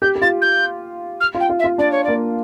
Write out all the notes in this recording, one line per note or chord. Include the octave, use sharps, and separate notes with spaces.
G4 G6
G4
F4 A6
G6
F6
F4
G5
F4
E5
F4
D4 D5
C#5
A#3 D5